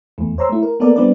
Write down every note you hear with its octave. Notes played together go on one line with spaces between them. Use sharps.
E2 A3
C5 C#5 A#5 C6 E6
A3 E4
A#4
A#3 B3 A4 A#4 D5
G3 B3 C4 D4 B4 D5